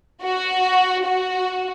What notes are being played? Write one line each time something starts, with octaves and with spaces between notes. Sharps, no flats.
F#4
F#4